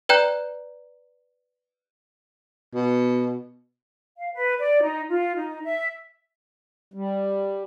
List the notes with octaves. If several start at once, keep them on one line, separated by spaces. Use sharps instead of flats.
B4 D5 G5 A#5 F#6 G6
B2
F5
B4
D5
D#4
F4
D#4
E5
G3